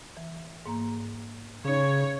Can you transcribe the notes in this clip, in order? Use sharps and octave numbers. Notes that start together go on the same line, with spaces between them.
E3
G#2 A#3 A#5
C#3 C#4 D#4 C#5